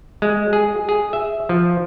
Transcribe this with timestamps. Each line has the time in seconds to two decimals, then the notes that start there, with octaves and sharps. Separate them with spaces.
0.22 G#3
0.53 G#4
0.89 G#4
1.13 E5
1.49 F3